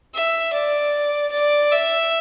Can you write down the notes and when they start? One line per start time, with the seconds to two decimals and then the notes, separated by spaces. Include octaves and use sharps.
0.14 E5
0.53 D5
1.32 D5
1.71 E5